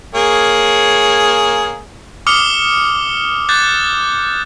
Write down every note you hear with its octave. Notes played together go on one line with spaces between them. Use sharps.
A#3 G#4 C#5
D6 D#6 F6 C#7 F7 G7
D6 F#6 G6 A6